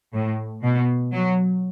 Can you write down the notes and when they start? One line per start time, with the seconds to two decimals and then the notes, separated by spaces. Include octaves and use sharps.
0.14 A2
0.63 B2
1.13 F#3